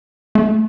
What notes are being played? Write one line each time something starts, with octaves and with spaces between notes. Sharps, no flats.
A3